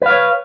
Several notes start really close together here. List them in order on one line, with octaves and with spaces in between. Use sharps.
B4 F5 C#5